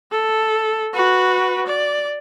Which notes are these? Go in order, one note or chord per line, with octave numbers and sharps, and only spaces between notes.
A4
F#4 B4
D5